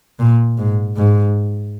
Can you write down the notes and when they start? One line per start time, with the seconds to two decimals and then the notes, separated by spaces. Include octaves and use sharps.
0.19 A#2
0.58 G#2
0.97 G#2